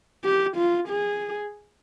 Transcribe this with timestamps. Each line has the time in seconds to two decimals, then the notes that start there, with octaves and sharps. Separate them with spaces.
0.24 G4
0.57 F4
0.89 G#4